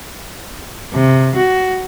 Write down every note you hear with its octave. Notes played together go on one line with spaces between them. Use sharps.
C3
F#4